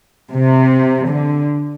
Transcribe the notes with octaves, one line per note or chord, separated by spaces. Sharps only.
C3
D3